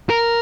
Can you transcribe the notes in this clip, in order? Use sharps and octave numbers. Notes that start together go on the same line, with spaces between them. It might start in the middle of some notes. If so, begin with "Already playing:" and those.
A#4